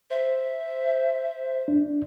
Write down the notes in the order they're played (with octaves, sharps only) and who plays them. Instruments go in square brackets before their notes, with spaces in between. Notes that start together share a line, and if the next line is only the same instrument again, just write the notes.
[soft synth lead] C5 [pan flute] E5
[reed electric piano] D4